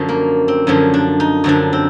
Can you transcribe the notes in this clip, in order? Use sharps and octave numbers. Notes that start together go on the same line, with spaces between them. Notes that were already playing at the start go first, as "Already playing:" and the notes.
Already playing: F#2 D3 F3
A#3
C4
F#2 D3 F3 C#4
D4
D#4
F#2 D3 F3 D4
C4